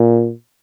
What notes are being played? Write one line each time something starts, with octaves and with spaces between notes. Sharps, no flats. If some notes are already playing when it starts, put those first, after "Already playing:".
Already playing: A#2